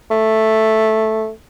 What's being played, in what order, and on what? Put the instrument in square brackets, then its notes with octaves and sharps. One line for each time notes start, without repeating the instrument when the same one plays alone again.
[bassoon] A3